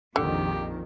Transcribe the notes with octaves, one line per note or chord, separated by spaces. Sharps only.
A#1 F2 D3 D#3 G4